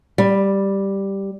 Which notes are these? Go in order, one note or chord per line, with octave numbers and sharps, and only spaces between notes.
G3